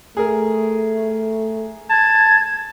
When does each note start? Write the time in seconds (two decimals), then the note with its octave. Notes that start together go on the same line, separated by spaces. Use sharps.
0.17 A3 G#4 A#4
1.90 A5 G#6